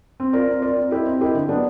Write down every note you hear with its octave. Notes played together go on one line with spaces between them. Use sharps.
C4
F4 A#4 D5
C4
F4 A#4 D5
C4
E4 G4 A#4 D#5
C4
E4 G4 A#4 D#5
D3
F#3 B3 D4 G4